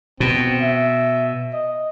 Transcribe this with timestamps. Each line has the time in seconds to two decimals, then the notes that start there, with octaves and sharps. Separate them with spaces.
0.20 B2 C4
0.61 E5
1.53 D#5